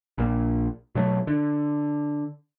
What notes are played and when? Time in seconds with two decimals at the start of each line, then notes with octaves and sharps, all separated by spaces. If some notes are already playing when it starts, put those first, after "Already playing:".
0.18 A#1 A#2
0.95 B2 F#3 G#3 A3
1.27 D3